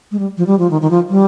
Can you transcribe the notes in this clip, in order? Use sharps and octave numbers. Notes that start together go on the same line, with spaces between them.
G#3
G3
F3
G3
F3
D#3
D#3
F3
G3